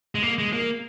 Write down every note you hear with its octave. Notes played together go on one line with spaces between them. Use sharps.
G#3
A#3
G#3
A#3